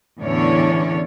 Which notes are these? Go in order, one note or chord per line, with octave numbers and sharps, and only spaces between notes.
E2 A2 D3 C#4 C#5 D5